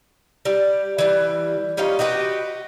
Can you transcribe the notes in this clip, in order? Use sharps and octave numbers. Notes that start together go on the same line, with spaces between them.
G3
E3 G3
G3 C#4 D#4 F4
D#4 F#4 G4 B4